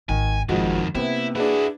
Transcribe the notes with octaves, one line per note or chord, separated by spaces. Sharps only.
G#1 D#3 G#5
G#1 F2 D#3 F3 G#3 F#4
C3 A#3 B3 E4
D4 E4 F#4 G#4 B4